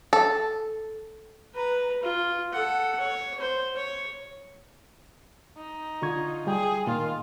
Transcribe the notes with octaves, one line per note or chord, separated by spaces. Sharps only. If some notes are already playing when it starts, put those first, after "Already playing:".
A4
B4 A#5
F4
A4 F#5
C#5
C5
C#5
D#4
D3 F4 C#6 G#6
G3 G#4 G5
A#2 D#3 F4